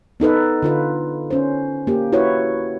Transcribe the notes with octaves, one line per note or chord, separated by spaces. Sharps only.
B3 D#4 A4 B4
D3 F4 B4
C#4 C5
A#3 G4
E4 F#4 B4 C#5